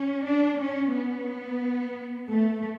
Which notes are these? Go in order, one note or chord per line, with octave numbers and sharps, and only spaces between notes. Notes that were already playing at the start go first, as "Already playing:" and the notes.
Already playing: C#4
D4
C#4
B3
A3